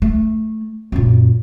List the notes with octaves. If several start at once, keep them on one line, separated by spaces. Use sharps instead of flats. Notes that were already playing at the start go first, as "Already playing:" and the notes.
A3
F#2 A#2